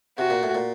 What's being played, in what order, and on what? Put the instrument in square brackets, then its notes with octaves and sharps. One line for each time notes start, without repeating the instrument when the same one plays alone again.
[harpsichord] C3 [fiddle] F#4
[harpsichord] A#2
A2
A#2